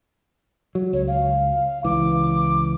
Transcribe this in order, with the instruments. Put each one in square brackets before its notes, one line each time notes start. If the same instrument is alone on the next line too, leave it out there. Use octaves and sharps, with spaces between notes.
[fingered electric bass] F#3
[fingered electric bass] C#2 [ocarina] C#5
[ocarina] F5
[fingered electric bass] C#2 E3 [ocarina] D6